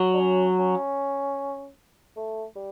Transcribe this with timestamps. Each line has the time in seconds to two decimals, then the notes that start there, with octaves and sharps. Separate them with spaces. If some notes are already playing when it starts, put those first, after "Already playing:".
Already playing: F#3
0.14 D4
0.19 C#4
0.58 C#4
2.17 A3
2.56 G3